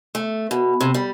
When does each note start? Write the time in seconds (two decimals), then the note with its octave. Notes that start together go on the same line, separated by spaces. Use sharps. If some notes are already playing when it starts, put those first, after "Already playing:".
0.15 A3
0.51 B2
0.81 C3
0.94 G3